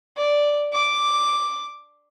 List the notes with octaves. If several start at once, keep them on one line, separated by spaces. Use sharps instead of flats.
D5
D6